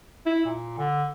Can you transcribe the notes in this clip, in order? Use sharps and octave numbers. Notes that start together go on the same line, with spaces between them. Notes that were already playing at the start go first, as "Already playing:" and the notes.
E4
A#2
D3